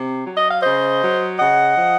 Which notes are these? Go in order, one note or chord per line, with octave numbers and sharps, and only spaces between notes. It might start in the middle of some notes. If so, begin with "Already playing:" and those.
Already playing: C3
F#3
D#5
F5
C#3 C5 D#5
F#3
C#3 D#5 F#5
F3